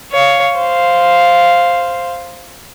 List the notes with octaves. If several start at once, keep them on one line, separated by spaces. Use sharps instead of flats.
C#5 F5
C5 F5